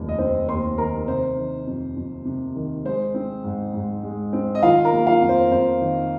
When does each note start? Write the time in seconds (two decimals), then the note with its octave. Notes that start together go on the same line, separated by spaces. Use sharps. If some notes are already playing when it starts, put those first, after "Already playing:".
Already playing: F1 D#2 D#3
0.09 D#5
0.18 C4 C5
0.48 D#2 C5 C6
0.78 D#3 A#4 A#5
1.08 C3 C5
1.37 D#3
1.67 F2
1.96 F2
2.25 C3
2.55 D#3
2.85 G#3 C5
3.14 C4
3.44 G#2
3.74 G#2
4.03 G#3
4.33 C4
4.55 D#5
4.62 D#3 F4 F5
4.85 A#4 A#5
4.92 A#3
5.07 F4 F5
5.22 F2
5.29 C5
5.51 F2 C5
5.81 D#3